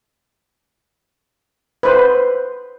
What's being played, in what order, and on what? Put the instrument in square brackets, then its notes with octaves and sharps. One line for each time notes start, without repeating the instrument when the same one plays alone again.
[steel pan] B4 C5